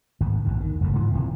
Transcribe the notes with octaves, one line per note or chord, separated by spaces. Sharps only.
G#1 D2 G#2
A#1 E2 G2
D#3
F#1 E2 G#2 A3
G#2 E3 F3
D#1 C3 E3